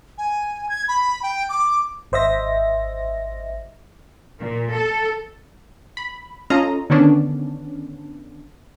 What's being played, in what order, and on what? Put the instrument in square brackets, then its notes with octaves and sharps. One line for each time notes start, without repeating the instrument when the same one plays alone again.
[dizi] G#5
G#6
B5
G5
D6
[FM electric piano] G#1 C5 D#5 E5 A#6
[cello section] A#2
A4
[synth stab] B5
C#4 F4 A4 D#5 A#5
D3 D#3 B3 C#4 D4